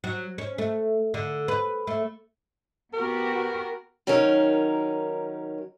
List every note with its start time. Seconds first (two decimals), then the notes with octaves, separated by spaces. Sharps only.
0.04 F#3
0.38 C#4
0.58 A3
1.14 D3
1.48 B4
1.87 A3
2.94 B3 F#4 G4 A#4
4.07 D#3 F#3 C#4 D#4 A#4